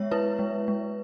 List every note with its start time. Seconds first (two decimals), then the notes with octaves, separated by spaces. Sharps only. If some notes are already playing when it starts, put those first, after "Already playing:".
Already playing: G#3 B3 C#5 E5
0.11 E4 B4
0.39 G#3
0.68 G#3